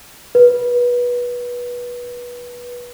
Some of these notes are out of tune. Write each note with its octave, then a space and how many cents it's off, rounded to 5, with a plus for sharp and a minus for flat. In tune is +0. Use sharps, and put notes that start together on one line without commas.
B4 -20